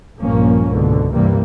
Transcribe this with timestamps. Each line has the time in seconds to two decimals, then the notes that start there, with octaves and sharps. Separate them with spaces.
0.20 A#1 G2 A#2 F3 A#3 C#4
0.66 C#2 G#2 B2 D3
1.13 G2 C3 E3 G3 A#3